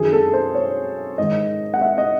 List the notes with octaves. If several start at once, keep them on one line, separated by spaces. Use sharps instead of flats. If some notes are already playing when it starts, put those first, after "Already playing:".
Already playing: F#2 D#3 G#4
A4
C5
C#5
G#2 D#3 D#5
F#5
E5
D#5